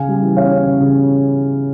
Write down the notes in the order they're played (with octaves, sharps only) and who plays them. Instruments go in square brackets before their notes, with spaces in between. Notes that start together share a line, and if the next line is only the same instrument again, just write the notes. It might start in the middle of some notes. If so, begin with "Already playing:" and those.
Already playing: [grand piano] C#3 F5 G#5
G3
E3
C#4 C#5 F5
C#4
C#3
C#3